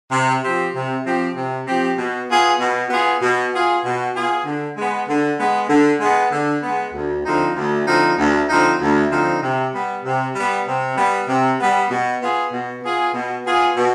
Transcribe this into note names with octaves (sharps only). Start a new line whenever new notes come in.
C3
F3 C4 G4
C3
F3 C4 G4
C3
F3 C4 G4
B2
B3 F4 G#4
B2
B3 F4 G#4
B2
B3 F4 G#4
B2
B3 F4 G#4
D3
G#3 B3
D3
G#3 B3
D3
G#3 B3
D3
G#3 B3
D2
D3 F3 C4 D#4
D2
D3 F3 C4 D#4
D2
D3 F3 C4 D#4
D2
D3 F3 C4 D#4
C3
G3 B3
C3
G3 B3
C3
G3 B3
C3
G3 B3
B2
B3 F4 G#4
B2
B3 F4 G#4
B2
B3 F4 G#4
B2